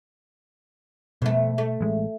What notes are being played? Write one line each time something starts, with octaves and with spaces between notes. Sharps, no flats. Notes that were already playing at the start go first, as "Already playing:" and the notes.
F2 B2 A3 B3
A3
A1 G#3